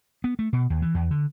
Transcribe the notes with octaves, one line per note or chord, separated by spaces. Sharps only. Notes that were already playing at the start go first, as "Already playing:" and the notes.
B3
A3
B2
D#2
E3
E2
D3